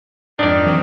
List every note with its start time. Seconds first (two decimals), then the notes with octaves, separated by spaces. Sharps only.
0.39 F2 G#2 D#3 D4 D#4 D5
0.66 A#2 E3 F#3 C4